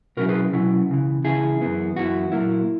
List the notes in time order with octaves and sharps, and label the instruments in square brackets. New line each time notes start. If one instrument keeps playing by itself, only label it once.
[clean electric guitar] B2 F#3 C#4 E4 F#4 A#4
G#4 B4
B2 F#3 C#4 E4
C#2 C#3 E3
C#2 C#3 E3 E4 G#4
F#2 E3 B3 E4
F#2 E3 B3 E4 F#4
A#2 F#3 A#3 E4